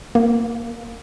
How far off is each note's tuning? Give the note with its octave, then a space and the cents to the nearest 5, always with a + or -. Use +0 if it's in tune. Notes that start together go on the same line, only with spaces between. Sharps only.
A#3 -5